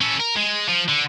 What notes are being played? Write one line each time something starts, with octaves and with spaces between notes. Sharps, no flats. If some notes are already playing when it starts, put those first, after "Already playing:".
C#4 A4
A#4
G#3
F3
D3